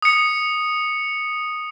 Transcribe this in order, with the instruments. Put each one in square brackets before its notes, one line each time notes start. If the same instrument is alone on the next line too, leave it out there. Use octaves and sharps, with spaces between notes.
[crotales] D#6 C#7